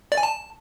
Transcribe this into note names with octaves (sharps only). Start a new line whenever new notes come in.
D5
G#5
A5